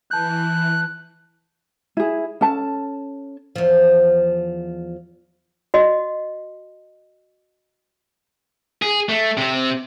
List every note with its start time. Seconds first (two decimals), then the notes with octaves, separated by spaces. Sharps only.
0.11 E3 A5 F#6 G6
1.97 E4 G#4
2.41 C#4 A4 A5
3.56 E2 F3
5.74 F#4 D#5
8.82 G#4
9.09 A3
9.37 C3 C4